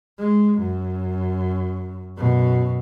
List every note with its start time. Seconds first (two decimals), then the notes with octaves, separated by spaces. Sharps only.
0.19 G#3
0.58 F#2
2.17 F#2 B2